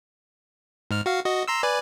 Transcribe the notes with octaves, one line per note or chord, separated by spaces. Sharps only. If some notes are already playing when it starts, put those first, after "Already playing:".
G#2 F6
F#4 F5
F#4 D#5
A#5 C6 E6
B4 D5 G#5